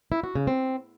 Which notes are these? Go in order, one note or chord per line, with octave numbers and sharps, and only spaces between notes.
E4
F#4
C#3
C4